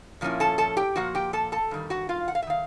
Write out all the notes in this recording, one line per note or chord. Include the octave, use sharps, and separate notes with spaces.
A#2 F3 A#3 C#4 E4
A4 A5
A4 A5
G4 G5
A#2 F3 A#3 F#4 F#5
G4 G5
A4 A5
A4 A5
G2 D#3 G3
F#4 F#5
F4 F5
F#5
F5
E5
D#3 F5